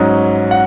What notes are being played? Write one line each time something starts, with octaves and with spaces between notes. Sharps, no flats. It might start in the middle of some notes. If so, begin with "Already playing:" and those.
Already playing: G#2 F#3 C#4 D#5
F#5